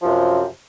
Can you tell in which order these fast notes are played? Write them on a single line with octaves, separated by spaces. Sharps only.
F3 F#2 C3